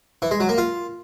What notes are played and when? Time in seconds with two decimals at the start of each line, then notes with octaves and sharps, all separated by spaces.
0.22 E3
0.31 G#3
0.40 F#3
0.49 A#3
0.58 F4